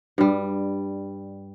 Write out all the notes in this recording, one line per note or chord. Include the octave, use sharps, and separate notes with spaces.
G2 G3